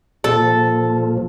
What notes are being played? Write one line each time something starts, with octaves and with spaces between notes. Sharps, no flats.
A#2 F3 A4